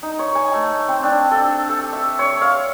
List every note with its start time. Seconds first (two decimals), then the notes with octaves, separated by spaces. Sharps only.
0.03 D#4
0.19 C#5
0.35 G#5
0.54 A3
0.88 C4
1.03 D4
1.31 A4
1.69 A4
1.93 E5
2.19 C#5
2.42 F5